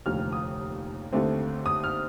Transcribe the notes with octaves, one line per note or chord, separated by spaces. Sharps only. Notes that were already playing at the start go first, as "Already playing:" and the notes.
F1 D#2 D3 F3 F6
D#6
D#2 D3 A3 C4
D#6
F6